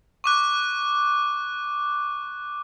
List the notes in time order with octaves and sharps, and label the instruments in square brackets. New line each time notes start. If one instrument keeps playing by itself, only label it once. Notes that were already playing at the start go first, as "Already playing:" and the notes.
[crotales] C#6 D6 F#6